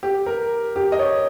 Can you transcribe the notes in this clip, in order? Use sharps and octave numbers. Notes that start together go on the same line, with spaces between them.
G4
A#4
G4
D#5
C#5